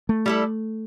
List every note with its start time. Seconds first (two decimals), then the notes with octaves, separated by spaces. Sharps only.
0.09 A3
0.26 G3 E4 A4